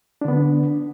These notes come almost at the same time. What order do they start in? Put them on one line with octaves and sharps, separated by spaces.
D4 D3 B3